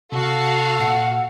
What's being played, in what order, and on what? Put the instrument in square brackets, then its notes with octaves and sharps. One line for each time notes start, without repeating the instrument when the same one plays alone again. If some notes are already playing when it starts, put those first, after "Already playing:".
[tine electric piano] C3 [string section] F#4 F5 [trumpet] A4
[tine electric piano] A#2 [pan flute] F#5